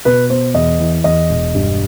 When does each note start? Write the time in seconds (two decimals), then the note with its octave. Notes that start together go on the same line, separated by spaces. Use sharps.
0.05 B2 B4
0.30 B3 C5
0.54 E2 D#5
0.79 E3
1.04 E2 D#5
1.30 E1
1.55 G2